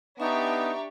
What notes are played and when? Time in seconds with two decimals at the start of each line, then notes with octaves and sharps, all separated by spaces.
0.20 B3 D4 D#4 G4 E5 A#5 C#6